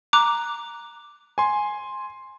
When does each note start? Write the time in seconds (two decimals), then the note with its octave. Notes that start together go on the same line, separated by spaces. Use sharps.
0.13 A#5 D6 F#6
1.38 G#5 C6